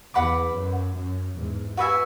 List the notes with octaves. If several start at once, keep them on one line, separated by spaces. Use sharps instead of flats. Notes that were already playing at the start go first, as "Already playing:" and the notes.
E2 B4 F#5 B5 D6
F#2
F#2
E2 G#2
F#4 B4 E5 G#5